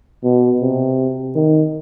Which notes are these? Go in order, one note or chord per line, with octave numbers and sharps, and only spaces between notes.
B2
C3
D#3